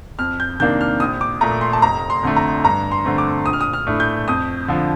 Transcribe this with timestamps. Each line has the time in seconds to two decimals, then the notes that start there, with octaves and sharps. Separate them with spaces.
0.19 F2 F6
0.40 G6
0.60 C3 D#3 A#3 D4 G6
0.81 F6
1.00 A#1 D#6
1.21 D6
1.41 A#2 A3 A#5
1.61 C6
1.73 A5
1.82 F1 A#5
2.10 C6
2.23 F2 D3 A3
2.36 A#5
2.64 G2 A#5
2.92 C6
3.04 D3 A3 C4
3.18 D6
3.46 A#1 D#6
3.53 F6
3.61 D#6
3.73 F6
3.87 A2 A3 D4
4.00 G6
4.28 F2 D#6
4.68 D3 F3